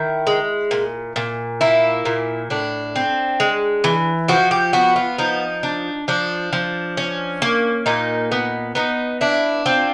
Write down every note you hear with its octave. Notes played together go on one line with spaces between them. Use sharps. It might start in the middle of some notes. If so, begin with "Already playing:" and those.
Already playing: D#3 E4
G#3
A#2
A#2
A#3 E4
A#2
A2 D4
C4
G#3
E3
F3 F#4
G4
B3 F#4
F4
F3 D#4
D4
F3 D4
F3
C#4
A#3
A#2 D#4
B3
B3 D#4
D4 E4
C4 F4